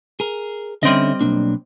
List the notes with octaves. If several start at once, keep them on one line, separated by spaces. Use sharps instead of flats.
G#4 A#4
D3 G3 C4 C#4 D#5 E5
B1 A#3 D4